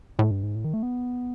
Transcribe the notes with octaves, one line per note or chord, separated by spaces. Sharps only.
A2
G2
G#2
A2
D#3
A3
B3